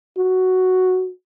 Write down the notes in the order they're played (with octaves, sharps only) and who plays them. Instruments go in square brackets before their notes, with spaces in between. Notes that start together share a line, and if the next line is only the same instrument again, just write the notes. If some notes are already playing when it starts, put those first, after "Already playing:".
[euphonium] F#4